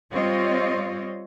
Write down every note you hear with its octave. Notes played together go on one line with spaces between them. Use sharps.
G3 C4 F4 C#5 D#5